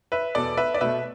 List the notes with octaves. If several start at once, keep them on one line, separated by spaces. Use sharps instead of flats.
B4 E5
E2 B2 B3 A4 D5
B4 E5
D5
B2 A3 B4 E5